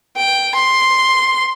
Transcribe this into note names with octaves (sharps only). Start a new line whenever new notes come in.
G5
C6